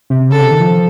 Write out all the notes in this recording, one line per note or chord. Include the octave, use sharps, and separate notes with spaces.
C3
C#3 A4
C3
D#3
F3